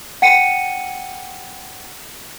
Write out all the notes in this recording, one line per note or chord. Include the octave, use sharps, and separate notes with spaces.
F#5 G5 C#7 D#7